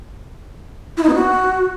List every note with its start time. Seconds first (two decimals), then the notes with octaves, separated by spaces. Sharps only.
0.97 E4
1.03 D#4
1.09 B3
1.15 F#4